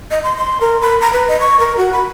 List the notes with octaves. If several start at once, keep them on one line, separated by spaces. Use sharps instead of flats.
D#5
C6
C6
A#4
B5
A#5
B4
D#5
C#6
A#4
F#4
B5